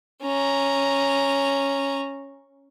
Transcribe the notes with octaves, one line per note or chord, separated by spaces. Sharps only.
C#4 A#5